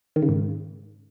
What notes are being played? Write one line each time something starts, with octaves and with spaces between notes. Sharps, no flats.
D#3
C#3
G#2